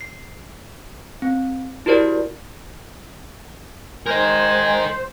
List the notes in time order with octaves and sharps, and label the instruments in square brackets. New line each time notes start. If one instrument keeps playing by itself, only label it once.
[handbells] C7
C4
E4 F#4 G4 A#4 C5 D5
[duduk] G#3 [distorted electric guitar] A#4 D#5 [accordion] C5 [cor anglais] G#5